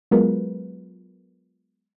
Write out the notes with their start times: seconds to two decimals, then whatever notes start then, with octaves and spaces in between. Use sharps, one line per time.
0.11 F#3 G#3 B3 F4 A#4 B4